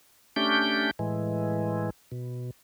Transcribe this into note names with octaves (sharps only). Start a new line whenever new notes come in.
A3 C#4 D4 G4 G6
A2 E3 G#3
B2